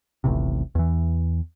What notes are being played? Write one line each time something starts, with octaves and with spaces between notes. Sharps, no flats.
D#1 A1 A2 C3
E2 E3